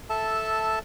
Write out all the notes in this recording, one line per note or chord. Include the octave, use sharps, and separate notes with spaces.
A4 E5 A5